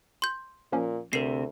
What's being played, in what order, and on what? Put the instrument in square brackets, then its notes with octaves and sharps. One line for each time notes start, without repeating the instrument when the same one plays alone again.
[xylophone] C6 G6
[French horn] A#2 [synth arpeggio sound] F3 A#3 C#4
[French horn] D2 [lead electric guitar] C3 [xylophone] A#4 C7